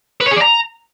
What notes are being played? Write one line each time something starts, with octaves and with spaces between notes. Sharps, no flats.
B4
C#5
G#4
D5
A#5